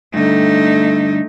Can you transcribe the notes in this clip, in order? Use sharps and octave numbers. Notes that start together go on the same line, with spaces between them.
G2 D3 A3 D#4